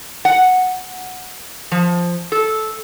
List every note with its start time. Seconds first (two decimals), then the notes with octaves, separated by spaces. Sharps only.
0.25 F#5
1.72 F3
2.32 A4